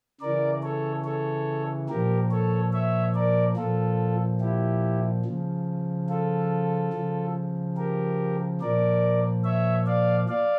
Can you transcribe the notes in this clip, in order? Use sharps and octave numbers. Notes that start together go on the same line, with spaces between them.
C#3 E3 A#4 D5
A4 C#5
A4 C#5
A#2 F3 G4 A#4
A4 C#5
C#5 E5
A#4 D5
A#2 F3 F4 A4
E4 G4
C#3 F3
F4 A4
C#3 F3
G4 A#4
A#2 F3 A#4 D5
C#5 E5
D5 F5
D5 F5